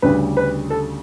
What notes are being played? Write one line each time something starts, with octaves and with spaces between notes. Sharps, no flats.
D2 C#3 G3 B4
B4
A4